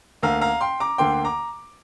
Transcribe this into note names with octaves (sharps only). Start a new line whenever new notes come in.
D2 D3 A#3 F5 A#5
F5 A#5
G5 C6
A#5 D6
D2 D3 A#3 G5 C6
A#5 D6